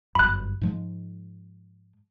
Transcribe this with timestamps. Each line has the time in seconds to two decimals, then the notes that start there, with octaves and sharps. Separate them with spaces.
0.15 G1 F#2 B5 F#6
0.61 G#2 F3 G#3